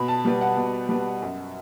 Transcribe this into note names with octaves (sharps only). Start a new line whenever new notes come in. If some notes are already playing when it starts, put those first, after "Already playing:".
Already playing: B2 B5
A5
G3 B3
F#5
B2
G3 B3
F#2